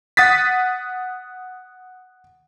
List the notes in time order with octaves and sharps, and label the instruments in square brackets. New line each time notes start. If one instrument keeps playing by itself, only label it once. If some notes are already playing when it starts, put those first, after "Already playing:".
[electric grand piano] F#5 D#6 A6 B6